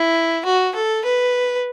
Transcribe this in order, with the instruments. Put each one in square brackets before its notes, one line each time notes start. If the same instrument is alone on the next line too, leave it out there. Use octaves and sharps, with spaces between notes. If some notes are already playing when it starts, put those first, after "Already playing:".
Already playing: [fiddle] E4
F#4
A4
B4